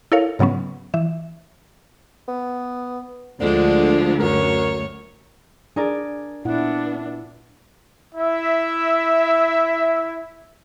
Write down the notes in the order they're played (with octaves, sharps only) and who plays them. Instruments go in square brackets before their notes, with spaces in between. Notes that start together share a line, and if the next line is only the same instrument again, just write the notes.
[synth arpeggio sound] E4 A4 A#4 C#5 F5
G#2 C#3 F#3 B3 C#4
E3 E5
[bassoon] B3
[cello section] D2 [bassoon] D3 [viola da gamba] F3 G#3 D4
[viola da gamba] F#2 C#5 [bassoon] A#4
[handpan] D4 [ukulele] G#4 A#4 D5
[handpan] A#2 E4 F#5 [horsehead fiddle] B3 D4
[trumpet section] E4 E5